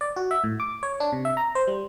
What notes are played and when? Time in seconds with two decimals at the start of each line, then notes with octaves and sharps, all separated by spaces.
0.01 D5
0.16 F#4
0.31 E5
0.44 A2
0.60 D6
0.83 C#5
1.00 D4
1.12 C3
1.25 E5
1.37 A#5
1.55 C5
1.67 G3